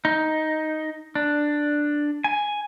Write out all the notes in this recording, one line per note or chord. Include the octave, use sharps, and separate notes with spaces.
D#4
D4
G#5